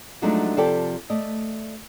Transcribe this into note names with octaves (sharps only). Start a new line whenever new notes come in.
F3 F#3 G#3 A3 D4 D#4
C3 F3 G4 A4 D5 G5
A3 D5 D#5